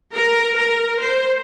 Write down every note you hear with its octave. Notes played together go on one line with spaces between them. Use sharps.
A#4
A#4
C5